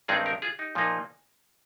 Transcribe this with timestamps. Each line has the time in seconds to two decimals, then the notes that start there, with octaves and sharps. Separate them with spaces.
0.08 G2 D#3 G#3 C4 D#4 F4 G#4
0.26 G4 A#4
0.42 F4 G#4
0.59 D#4 G4
0.75 A#2 F3 A#3 D#4